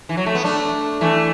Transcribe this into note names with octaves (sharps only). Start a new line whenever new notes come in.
E3
F#3
A3
B3
A3 D4
E3 A3